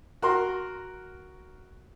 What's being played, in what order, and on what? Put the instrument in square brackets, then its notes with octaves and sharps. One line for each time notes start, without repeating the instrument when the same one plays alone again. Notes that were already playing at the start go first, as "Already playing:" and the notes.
[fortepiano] F#4 A#4 C6